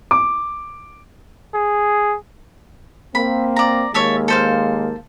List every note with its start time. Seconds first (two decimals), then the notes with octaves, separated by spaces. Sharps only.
0.11 D6
1.54 G#4
3.15 A#3 C4 B5
3.56 D5 A#5
3.94 D#2 G#3 A#3 C#5 E5 A5
4.28 A4 C5 F5